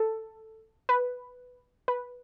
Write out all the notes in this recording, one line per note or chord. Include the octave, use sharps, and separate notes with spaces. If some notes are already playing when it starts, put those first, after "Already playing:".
Already playing: A4
B4
B4